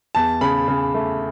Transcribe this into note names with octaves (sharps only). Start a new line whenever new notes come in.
E2 A5
C#3 B5
C#3
A3